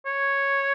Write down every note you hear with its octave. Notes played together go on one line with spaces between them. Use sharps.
C#5